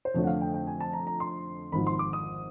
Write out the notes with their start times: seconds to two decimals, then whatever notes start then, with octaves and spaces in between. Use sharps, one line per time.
0.05 C5
0.14 F2 D3 F3 A3 C#5
0.23 F#5
0.27 F5
0.41 G5
0.54 G5
0.67 G#5
0.81 A5
0.93 A#5
1.07 A#5
1.20 C6
1.72 G#1 G#2 F3 B5
1.87 C6
1.99 D6
2.13 D#6